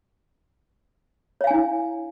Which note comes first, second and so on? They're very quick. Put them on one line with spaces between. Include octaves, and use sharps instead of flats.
C#5 F5 G#5 D4 E4